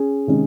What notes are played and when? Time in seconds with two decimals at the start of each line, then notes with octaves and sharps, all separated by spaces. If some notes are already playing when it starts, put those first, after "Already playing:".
Already playing: C#4 G#4
0.27 C3 D#3 G#3 C#4